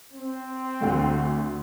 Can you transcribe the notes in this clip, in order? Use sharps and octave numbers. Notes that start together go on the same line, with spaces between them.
C4
D2 D3 A3